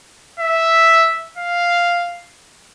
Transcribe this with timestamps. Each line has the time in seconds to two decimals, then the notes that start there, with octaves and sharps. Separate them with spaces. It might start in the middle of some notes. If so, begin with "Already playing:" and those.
0.39 E5
1.37 F5